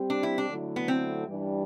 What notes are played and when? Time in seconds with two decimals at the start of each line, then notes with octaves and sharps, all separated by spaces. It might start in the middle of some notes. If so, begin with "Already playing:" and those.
Already playing: G3 C4 G4
0.10 D4
0.23 E4
0.38 D4
0.48 D3 F#3 A3 E4
0.76 B3
0.88 C4
1.26 G2 E3 G3 D4